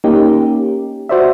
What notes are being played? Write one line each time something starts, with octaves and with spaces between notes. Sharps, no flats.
A#3 C#4 D#4 G4
F#4 C5 D5 E5